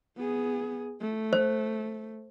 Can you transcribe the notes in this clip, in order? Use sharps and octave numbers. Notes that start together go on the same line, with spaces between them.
B3 G#4
A3
C5